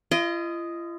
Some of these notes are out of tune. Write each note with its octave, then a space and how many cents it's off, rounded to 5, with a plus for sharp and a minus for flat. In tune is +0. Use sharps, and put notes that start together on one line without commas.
F4 -45 D#5 +0